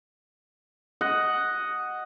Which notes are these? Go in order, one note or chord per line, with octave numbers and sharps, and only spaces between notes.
D#5 F#5